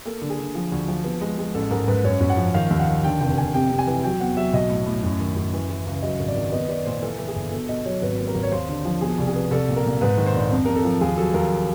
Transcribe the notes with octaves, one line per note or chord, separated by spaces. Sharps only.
A#3 A4
D3
G#4
D3
F3
D2
F3
B3
G#3
G#3
A1 A4
G#2 A#4
G#2 B4
F#2 C#5
F#2
F#5
F3
D#3 F5
D#2
F#5
D#3
D3 G5
F1 G5
F1 G#5
C3 G5
C3
G#5
E3
F#3 G5
E2 F#5
F#3 E5
B1 D#5
A2
A2
F#2
D#3
F#2
E3
E3
C#2
F#3 D#5
G#1
D5
D#3
B3 D#5
B3 D5
A#2 C5
E3 A4
E3
G#4
G1
B2 A4
B2 D#5
F#3 C#5
G#1 B4
A#3
A#4
G#1
C#5
D#2 C5
D3
F3
B2 G#4
C2
G#4
B3
C2 A4
A#2
A#4
A#2
G#2 B4
D#3
C5
A#1
F2
F2 A#4
A4
F3
D#2 G#4
F#3 A4
D#2 A#4